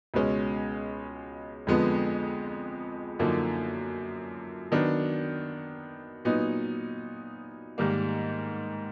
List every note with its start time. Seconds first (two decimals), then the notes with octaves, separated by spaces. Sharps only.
0.14 C#2 B2 G#3 C#4
1.67 F2 D3 F3 G#3 B3
3.19 F#2 D3 F3 A#3 D#4
4.72 D#3 F#3 B3 D4
6.25 A#2 F#3 B3 D#4
7.78 G#2 D#3 G3 A#3